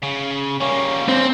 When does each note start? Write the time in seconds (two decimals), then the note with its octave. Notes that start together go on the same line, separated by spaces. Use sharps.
0.03 C#3
0.61 G3 A#3 C#4
1.08 C4